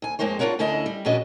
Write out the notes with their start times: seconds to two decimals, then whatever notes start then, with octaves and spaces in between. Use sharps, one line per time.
0.02 D2 G#5
0.19 F2 C#3 G#3 A#3 C5 C#5
0.39 D4 F4 G#4 A#4 C#5 F#5
0.59 D2 D3 C#4 D4 E4 D#5
0.86 G3
1.06 A#2 F3 C#4 D4 F#4 D#5